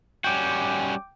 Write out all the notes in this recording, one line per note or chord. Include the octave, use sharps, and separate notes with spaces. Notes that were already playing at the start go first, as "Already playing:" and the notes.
G3 C#4 F#4 G5 D6